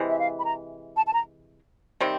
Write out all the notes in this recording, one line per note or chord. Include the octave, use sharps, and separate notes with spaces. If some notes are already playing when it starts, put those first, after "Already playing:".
Already playing: C3 E3 G#3
E5
F5
B5
A#5
A5
A5
A#5
C3 D#3 G3 C4